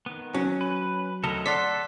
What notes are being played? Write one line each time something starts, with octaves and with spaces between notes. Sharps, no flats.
D#3 B3
F#3 C#4
B4
D2 A4 A#4 D#5
A4 D5 F#5 C6 B6